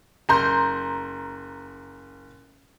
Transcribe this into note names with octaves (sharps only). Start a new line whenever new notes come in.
F#1 A#5 C6 G6